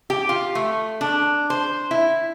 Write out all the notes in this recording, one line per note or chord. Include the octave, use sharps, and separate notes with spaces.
G4
F4
A3
D4
C5
E4